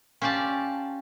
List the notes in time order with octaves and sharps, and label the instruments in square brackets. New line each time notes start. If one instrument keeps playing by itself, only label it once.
[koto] C#4 F4 G4 D5 A5